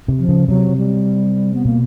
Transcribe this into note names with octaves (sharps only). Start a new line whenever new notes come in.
C3
F3
C#3
C3 F#3
G3
B3
B2 A#3